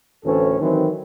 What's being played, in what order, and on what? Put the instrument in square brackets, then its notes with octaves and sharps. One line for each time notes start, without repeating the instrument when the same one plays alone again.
[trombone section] D2 A2 E3 C4 C#4 A4
D#3 E3 F#3 C4